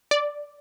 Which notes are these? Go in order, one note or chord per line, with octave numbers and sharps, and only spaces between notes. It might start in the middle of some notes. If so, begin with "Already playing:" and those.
D5